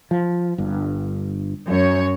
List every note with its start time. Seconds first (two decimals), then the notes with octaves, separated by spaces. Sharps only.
0.11 F3
0.58 G1 G2
1.67 F#2 C#5